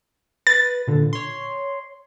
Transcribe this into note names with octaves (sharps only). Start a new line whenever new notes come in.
B4 A6
A#2 D3
C#5 C6